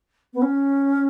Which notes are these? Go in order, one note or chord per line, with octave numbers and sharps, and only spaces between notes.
B3
C#4